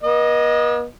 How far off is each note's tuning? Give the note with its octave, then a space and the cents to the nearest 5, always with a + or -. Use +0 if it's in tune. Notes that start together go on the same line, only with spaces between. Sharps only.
B3 -45 D#5 +0